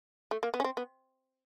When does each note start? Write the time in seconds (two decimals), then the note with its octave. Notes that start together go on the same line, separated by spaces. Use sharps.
0.31 A3
0.43 A#3
0.54 B3
0.60 C#4
0.64 C4
0.77 B3